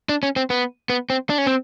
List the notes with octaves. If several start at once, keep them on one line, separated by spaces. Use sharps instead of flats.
D4
C#4
C4
B3
B3
C4
D4
C#4
C4